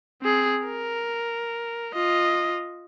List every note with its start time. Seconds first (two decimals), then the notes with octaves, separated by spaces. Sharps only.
0.22 C4 G#4
0.66 A#4
1.94 F4 D#5